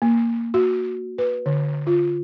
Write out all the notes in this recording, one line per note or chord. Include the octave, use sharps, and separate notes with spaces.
A#3
F#4
B4
D3
F4